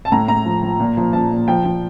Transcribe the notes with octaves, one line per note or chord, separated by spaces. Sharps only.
A5
A2 A#5
A2 A#5
F3
F3
A#2
F3
F3 A5
A#2
F3 G5
F3